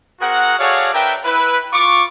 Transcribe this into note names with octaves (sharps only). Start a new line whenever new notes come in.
C4 F#4 G#4 A#4 F#5
F#4 G#4 A4 C#5 D5 F5
D4 A#4 B4 E5 G5
E4 B4
F4 C#6 D6